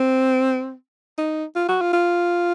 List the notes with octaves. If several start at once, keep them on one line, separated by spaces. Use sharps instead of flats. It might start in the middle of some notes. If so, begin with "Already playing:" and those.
Already playing: C4
D#4
F4
F#4
F4
F4